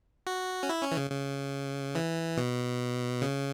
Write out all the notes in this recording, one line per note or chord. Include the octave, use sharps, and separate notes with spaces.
F#4
C#4
E4
C#4
E3
C#3
C#3
E3
B2
C#3